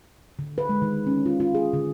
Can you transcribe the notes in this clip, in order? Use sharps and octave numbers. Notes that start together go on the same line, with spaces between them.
D3
B4
G#3
D#3
C#4
F4
F4
G#4
D3